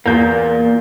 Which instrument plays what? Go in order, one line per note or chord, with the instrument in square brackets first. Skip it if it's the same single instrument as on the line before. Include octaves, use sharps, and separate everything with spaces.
[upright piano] E2 G6 [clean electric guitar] A#2 A#3